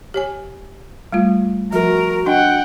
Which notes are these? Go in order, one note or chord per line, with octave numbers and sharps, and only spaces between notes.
G4 C#5 G#5
G3 A3 F4
F3 F#4 A#4
D4 D#5 F#5 G5